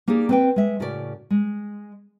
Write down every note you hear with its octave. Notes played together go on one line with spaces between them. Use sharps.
A#3 D#4 G4 G#4 D5
C4 B4 G5
G#3 E5
A2 C#3 F#4 A#4 B4 D5
G#3